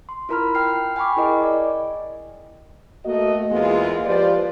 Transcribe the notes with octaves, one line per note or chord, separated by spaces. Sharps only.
C6
E4 F4 A#4 A#5 B5 F6
G5 F6 C7
G5 G#5 B5 C#6 D6
E4 G#4 A#4 D#5
D5
A3 A#3 F#4 D#5
E2 G#3 A#3 B3 F4
F3 F4 G4 B4 C5 D5